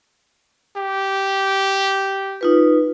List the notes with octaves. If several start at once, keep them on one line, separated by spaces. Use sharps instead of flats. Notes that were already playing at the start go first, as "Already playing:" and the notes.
G4
D#4 F4 B4